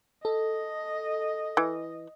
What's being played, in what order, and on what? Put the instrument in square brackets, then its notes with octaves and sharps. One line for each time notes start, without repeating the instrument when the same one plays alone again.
[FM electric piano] A4 [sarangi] D#5
[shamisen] E3